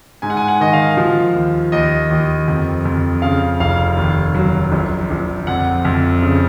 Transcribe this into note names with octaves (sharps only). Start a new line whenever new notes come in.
G#2 G#5
F#5
G#5
F#5
D#3 D#5
F5
F3
D#2
D#2 D#5
D#2
F2
F2
C#3 F5
F1 F5
D#2
F#3
A#1
A#1
F2 F#5
F2
C#3